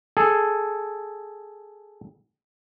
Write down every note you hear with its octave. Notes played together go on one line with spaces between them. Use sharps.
G#4 A4